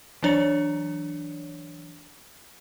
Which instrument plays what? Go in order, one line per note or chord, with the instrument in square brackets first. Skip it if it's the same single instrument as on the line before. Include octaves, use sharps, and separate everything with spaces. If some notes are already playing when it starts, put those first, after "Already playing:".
[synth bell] E3 F#3 D4 C#5 D5 C#7